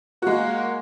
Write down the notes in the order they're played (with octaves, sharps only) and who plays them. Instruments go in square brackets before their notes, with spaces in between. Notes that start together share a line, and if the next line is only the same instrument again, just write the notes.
[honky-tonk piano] G#3 F#4 [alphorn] A#3